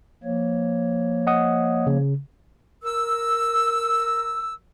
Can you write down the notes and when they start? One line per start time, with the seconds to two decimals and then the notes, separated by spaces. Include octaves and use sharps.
0.23 F3 A#3 C#5
1.27 D#5 F#5 D#6
1.87 C#3
2.83 A#4 E6